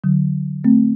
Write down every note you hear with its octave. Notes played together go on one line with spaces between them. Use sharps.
D3 F#3
A3 C4